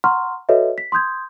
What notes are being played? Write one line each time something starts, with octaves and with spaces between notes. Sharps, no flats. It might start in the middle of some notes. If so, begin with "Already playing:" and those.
F#5 A#5 C6 C#6 F6
F#4 A4 B4 C#5 D#5 E5
B6
C6 D#6 G6 G#6